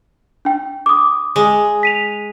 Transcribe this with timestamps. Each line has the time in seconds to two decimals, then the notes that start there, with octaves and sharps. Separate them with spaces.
0.45 D4 G5
0.86 D6 D#6
1.36 G#3
1.83 B6 D#7 F7